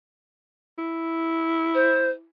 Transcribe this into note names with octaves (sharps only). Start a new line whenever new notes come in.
E4
C5